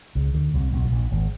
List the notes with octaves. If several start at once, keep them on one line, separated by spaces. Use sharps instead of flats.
C#2 C#3
D2 D3
C2 C3
B1 B2
A2
A#1 A#2
G#1 G#2